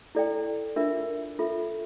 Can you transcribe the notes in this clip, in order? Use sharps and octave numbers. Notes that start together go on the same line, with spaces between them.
E4 A4 D5 G5
D4 F4 A#4 E5
F4 A4 E5